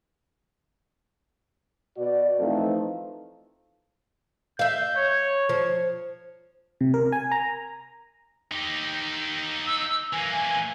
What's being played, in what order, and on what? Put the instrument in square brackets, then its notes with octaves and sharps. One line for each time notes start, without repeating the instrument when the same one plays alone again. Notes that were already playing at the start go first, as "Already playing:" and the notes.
[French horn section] B2 F#4 D5
E3 F3 A3 C4 D#4 A4
[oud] E5 F5 [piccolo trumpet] G6
[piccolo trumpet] C#5
[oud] F3 C5
[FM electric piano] C3
A#4
G#5
A#5
[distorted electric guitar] D#4 G4
[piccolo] E6
[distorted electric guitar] E3 A#3 [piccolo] G#5